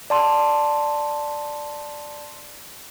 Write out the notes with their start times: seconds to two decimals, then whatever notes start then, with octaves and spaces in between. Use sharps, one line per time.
0.10 D5 A5 C6